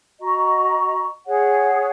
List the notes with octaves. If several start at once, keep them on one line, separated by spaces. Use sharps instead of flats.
F#4 D#5 A#5 C#6
G#4 C#5 F#5